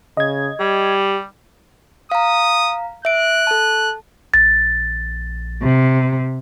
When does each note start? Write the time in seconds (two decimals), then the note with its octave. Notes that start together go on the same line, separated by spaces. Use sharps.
0.17 C#3 D#5 G#6
0.60 G3 G4
2.11 F5 A#5 D#6
3.05 E5 F#6 D7
3.47 A4 A5
4.34 A#1 A6
5.64 C3